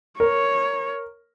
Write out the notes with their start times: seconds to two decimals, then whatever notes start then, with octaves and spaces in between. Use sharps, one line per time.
0.20 A#4 C#5